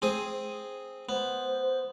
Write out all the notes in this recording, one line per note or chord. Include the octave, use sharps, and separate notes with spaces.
C4 G#4 D#6
B3 C5